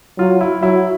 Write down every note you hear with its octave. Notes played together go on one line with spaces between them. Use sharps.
F#3 F4
E4
F#3 E4